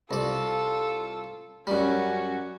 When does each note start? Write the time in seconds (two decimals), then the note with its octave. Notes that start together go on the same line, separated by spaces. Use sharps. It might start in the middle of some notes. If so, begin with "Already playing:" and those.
0.11 C2 F4 A4 D5
1.67 F#2 G3 C#4 F#4